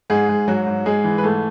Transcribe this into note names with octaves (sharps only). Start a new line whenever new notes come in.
G#2 G#3 G#4
G#2
G#2 F#3 F#4
G#2
G#2 G#3 G#4
E3
B4
G#2 A3 A4